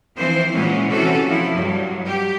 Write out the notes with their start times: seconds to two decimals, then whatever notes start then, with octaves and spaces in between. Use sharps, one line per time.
0.16 E3 F3 C4 C5
0.52 A#2 E3 F#3 G#3 C#4
0.87 C3 E3 C#4 F#4 A4
1.25 F3 E4
1.54 G2 F#3
2.06 G4